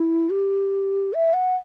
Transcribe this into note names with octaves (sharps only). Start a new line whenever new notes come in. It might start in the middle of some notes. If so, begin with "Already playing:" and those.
Already playing: E4
G4
E5
F#5